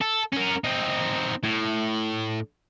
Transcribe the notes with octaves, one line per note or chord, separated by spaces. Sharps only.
A4
C#4 A#4
C4 D#4
A2